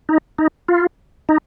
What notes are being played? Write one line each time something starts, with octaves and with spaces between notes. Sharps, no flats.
D#4
D#4
F4
D#4